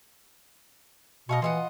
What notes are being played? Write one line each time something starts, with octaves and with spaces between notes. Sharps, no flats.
B2 D#5 F5 C#6
E3 F4 D#5 F#5